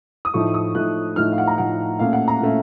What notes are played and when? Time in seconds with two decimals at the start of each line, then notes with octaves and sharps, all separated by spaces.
0.25 D#6
0.34 A2 F3 A3 D#4 C#6
0.54 D#6
0.75 A2 F3 A3 D#4 F#6
1.16 A2 F3 A3 D#4 F6
1.32 F5
1.38 F#5
1.47 A#5
1.58 A2 F3 A3 D#4 F#5
1.99 A#2 A3 C#4 F5
2.13 F#5
2.28 A#5
2.41 A#2 A3 C#4